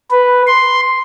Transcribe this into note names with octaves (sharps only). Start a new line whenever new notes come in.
B4
C6